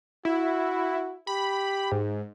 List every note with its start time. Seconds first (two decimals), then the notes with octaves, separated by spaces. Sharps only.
0.25 E4 F#4
1.27 G4 B5
1.92 G#2